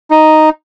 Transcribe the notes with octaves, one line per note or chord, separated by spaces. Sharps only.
D#4